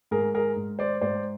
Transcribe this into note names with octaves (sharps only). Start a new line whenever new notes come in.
G#2 G#4 A#4
G#4 A#4
G#2
C5 D5
G#2 C5 D5